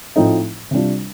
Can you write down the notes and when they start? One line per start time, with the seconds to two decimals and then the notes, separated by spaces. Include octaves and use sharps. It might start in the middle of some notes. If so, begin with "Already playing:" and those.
0.16 A2 F3 A3 C4 D#4
0.71 C3 G3 D4 F4